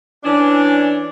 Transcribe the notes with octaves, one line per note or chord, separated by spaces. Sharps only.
E3 C#4 D4